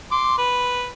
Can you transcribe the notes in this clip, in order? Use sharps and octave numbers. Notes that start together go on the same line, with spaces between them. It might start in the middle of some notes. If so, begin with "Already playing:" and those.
C6 D6
B4